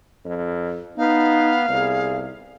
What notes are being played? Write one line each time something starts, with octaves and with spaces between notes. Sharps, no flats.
F2
B3 D#4 F5
C2 G#4